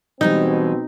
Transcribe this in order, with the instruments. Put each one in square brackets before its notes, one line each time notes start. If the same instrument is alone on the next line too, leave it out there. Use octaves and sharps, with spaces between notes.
[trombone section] B2 C4 [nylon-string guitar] E3 G3 G#3 [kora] D#4